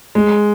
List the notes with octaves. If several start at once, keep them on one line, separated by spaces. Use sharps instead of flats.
G#3